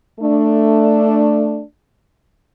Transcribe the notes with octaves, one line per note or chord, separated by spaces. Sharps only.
A3 D4